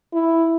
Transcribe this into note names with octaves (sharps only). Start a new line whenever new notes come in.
E4